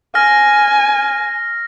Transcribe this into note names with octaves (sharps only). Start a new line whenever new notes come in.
G#5 F6 A#6